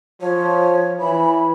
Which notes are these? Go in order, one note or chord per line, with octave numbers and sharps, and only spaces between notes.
F3 C#5
E3 B5